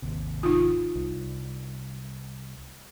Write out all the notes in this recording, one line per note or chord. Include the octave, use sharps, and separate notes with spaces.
G#1 D#2 C3
D#4 F4
C2